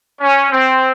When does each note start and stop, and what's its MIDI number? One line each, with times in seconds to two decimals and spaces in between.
0.20 0.50 61
0.51 0.92 60